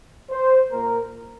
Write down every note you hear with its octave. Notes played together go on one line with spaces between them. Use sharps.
C5
A#2 A#3 A#4